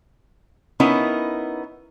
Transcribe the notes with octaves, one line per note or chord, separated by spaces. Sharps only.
B3 C#4 D#4 E4 A#4